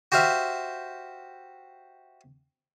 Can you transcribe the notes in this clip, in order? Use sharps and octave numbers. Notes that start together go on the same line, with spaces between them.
F#4 G4 C5 E5 F5